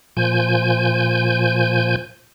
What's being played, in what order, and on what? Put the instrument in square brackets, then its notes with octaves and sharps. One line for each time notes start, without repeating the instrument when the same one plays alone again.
[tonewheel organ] A#2 F3 G#5 G6